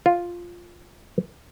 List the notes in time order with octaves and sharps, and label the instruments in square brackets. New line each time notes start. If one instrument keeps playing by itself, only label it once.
[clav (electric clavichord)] F4